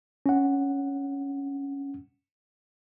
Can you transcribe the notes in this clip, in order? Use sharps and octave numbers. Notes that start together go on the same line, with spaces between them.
C#4 F#5